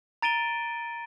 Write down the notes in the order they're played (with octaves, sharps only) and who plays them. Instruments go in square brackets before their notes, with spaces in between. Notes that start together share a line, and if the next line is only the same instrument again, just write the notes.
[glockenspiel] A#5 A6 D7 D#7 G7